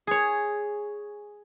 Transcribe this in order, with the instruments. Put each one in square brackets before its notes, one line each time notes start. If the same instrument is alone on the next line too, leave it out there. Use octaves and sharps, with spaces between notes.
[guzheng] G#4 C#5